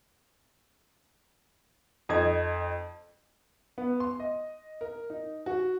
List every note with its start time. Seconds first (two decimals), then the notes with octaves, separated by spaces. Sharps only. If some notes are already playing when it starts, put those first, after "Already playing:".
2.09 F2 D#4 G#6
3.78 B3
4.00 C6
4.20 D#5
4.81 A#4
5.10 D#4
5.46 F#4